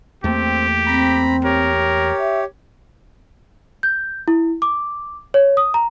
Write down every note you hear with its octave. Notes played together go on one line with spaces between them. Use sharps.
E2 A3 A#3 C4 G4
C4 A#5 B5
G4 A#4 C#5
E5
G6
E4
D6
C#5
D#6
A#5